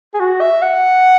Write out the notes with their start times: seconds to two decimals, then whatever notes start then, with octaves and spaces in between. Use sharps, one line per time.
0.14 G#4
0.20 F#4
0.41 E5
0.62 F#5